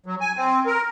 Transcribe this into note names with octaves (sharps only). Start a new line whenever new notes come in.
F#3
G#5
C4
A#4